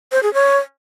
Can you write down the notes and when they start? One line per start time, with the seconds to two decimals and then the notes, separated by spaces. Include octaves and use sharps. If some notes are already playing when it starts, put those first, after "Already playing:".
0.12 C5
0.23 G#4
0.34 C#5